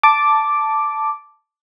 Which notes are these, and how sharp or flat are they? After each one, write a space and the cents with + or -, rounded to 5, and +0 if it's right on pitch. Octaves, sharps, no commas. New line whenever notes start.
A5 +0 D6 +0